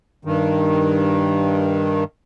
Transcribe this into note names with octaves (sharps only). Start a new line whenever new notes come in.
G2 D#3